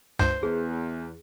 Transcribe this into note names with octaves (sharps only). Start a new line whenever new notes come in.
C#2 G2 C5
E2 G#4